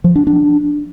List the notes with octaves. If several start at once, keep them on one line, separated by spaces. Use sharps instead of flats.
F3
D4
D4